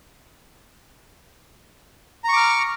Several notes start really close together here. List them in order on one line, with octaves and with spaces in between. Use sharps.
A#5 C#6 D6 F6